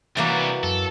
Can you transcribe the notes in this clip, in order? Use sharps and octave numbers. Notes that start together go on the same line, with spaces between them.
C3 E3 F#3 G3 A#3
F#2 A4